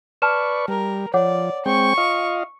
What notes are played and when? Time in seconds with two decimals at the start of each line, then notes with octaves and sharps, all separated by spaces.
0.22 B4 D5 A5 C#6 F6 E7
0.68 G3 A#4
1.14 F3 C#5 D5 F#5 D6
1.66 G#3 C4 G5 C#6
1.98 F4 D#5 F5